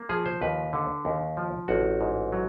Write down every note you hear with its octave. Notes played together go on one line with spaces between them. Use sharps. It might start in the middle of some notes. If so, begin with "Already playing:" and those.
Already playing: A#3
F3 G#4
C5
D#2 B4
D3
D#2
F3
A1 F#4
G#2
F#3